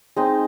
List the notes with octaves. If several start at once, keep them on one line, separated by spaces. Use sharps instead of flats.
G#3 C4 D#4